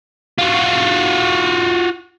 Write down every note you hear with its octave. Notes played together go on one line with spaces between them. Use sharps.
F4 F#4